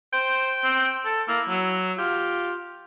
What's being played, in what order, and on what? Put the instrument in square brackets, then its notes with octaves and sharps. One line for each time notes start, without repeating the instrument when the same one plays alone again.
[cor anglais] C5 [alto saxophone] G5
[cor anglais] C4
A4
[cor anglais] A#3 [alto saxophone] E4
[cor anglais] F#3
[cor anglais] F4 [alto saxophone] G4